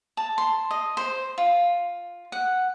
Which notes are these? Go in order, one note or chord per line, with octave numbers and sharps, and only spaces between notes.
A5
C6
D#5
C5
F4
F#5